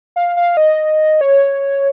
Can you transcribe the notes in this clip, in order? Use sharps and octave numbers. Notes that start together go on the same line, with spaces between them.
F5
F5
D#5
C#5